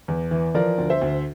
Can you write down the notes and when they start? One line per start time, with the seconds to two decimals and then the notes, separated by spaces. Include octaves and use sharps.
0.08 E2
0.31 E3
0.55 F3 A#4 D5
0.78 D2
0.90 C5 E5
1.02 D2